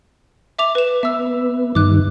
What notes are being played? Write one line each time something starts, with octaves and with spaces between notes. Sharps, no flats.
E5 D6 F7
B4 E7
B3 E5 E6
G2 D#3 D6 F#6